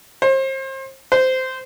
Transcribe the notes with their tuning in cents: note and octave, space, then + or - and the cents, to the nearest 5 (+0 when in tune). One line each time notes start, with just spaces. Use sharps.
C5 +35
C5 -15